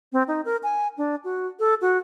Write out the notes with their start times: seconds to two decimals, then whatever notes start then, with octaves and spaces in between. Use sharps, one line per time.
0.13 C4
0.28 D#4
0.45 A#4
0.63 G#5
0.98 D4
1.24 F#4
1.60 A4
1.81 F#4